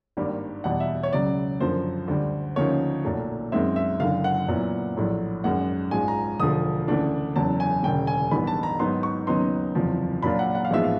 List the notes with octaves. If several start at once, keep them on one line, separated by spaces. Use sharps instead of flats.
G#1 G2 D#3 G3 A#3
E2 B2 G3 F#5
E5
C#5
C#2 C#3 F#3 D5
F#2 D3 F3 A#3 C5
D2 D3 G3
D2 C#3 F3 A#3 D#4 C#5
B1 A#2 F#3 A3
F#2 D#3 G#3 C4 E5
E5
F#1 F#2 D3 F5
F#5
A#2 F#3 B3 E4
A#1 A2 F#3
G#1 F#2 D#3 G#3 C#4 F#5
A#1 G#2 F3 G#3 G#5
A#5
E1 D2 D3 F3 A3 D#6
D2 C#3 E3 A3 D4
F#1 E2 C#3 F#3 A5
G#5
E1 D2 C#3 G5
G#5
A1 G2 D#3 G3 B3 B5
A5
A#5
G#2 D#3 F#3 B3 D#4 C6
C#6
D#2 C#3 F#3 B3 D#4 C6
F#1 E2 C3 F3
A#2 F#3 A#3 D4 F4 B5
F#5
F#5
F5
A1 G#2 F3 G#3 B3 E5
F5